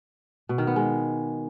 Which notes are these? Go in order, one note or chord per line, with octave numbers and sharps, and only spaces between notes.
B2
D#3
B3
G#3